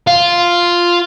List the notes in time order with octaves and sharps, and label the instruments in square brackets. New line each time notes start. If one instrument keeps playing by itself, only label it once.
[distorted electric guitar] F4